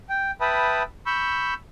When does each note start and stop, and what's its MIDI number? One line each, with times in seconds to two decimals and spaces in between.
0.09 0.31 79
0.41 0.83 71
0.41 0.83 76
0.41 0.83 79
0.41 0.83 81
0.41 0.83 83
0.41 0.83 87
1.06 1.54 83
1.06 1.54 85
1.06 1.54 88
1.06 1.54 91